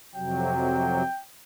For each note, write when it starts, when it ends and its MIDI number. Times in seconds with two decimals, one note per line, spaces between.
0.15 1.03 41
0.15 1.03 48
0.15 1.03 54
0.15 1.21 79